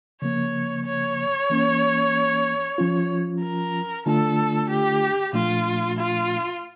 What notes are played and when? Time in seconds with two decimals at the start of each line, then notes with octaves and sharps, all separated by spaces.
0.22 C#3 F3 A#3 C#5
0.86 C#5
1.50 E3 A#3 C#4
2.78 F3 C#4 F4
3.42 A#4
4.06 D3 A3 D4 F4 A4
4.69 G4
5.33 A#2 F3 A3 D4 F4
5.98 F4